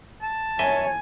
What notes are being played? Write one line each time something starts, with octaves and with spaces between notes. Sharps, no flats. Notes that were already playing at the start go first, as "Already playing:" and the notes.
A5
F#2 C#5 D#5 E5 G#5